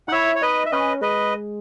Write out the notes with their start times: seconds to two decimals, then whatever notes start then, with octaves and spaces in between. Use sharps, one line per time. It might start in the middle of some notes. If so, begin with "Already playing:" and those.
0.08 D#4 F#5
0.12 E4 C#5 E5
0.35 C#5
0.42 D#4 B4 D#5
0.66 E5
0.71 C#4 B4 D#5
1.01 G#3 B4 D#5